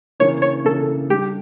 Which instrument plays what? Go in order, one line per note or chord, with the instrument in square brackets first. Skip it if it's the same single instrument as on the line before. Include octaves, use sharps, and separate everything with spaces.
[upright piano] C#3 E3 A#3 D4 [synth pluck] C#5
[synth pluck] C#5
[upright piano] C#3 E3 A#3 D4 [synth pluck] A4
[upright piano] G3 D4 A4 [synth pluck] G4